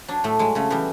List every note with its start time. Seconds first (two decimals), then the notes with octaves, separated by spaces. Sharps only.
0.08 F#3 D4
0.24 A2 A3
0.39 F#3 G#3
0.55 C#3 A3
0.70 E3 G3 B3